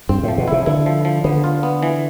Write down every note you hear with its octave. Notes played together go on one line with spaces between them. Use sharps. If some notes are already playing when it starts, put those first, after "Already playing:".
G2 C4
A2 F3
B2
C3 E4
D3 E4
F3
F3
D3 B3
F4
B3
E3